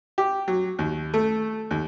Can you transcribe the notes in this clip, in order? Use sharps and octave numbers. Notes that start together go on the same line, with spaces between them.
G4
F#3
D#2
A3
D#2